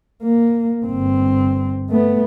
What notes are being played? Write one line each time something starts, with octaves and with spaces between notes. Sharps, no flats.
A#3
G1 C4
A3 B3